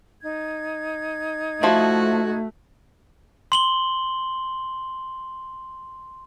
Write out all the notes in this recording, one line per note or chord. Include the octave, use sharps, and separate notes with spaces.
D#4 G#6
F3 A3 E4 F#4
C6 F#7 G7